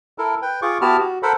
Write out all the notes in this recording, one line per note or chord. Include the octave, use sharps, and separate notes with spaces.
E4 A4 A#4
B4 G5
F4 G#4 C#6 D6
B3 E4 F#4 G4 A5 F6
F#4
A4 A#4 C5 F#5 B5